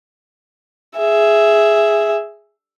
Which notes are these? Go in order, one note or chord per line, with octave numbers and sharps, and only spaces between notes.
G#4 E5